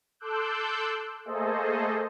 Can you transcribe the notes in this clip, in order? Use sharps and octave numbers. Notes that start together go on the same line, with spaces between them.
A4 C6 D6 E6 F#6 G6
A3 A#3 G#4 A4 C5 D#5